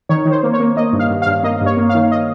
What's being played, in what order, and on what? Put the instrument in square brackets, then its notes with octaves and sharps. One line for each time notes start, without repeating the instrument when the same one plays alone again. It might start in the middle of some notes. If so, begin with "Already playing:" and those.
[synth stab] D#3 C#5
D#3
C5
A#3
C#5
A#3
A#3 D#5
G2
F5
G2
G2 F5
A#3 D#5
G2 C#5
A#3
F5
D#3
D#5